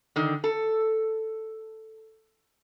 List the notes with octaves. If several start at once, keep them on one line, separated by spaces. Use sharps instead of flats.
D3 D#3
A4